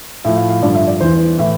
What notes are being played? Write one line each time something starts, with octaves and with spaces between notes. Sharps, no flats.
A2 F3 E5
F5
F5
G2 D3 F3 D5
E5
D5
E2 E3 C5
A2 E3 E5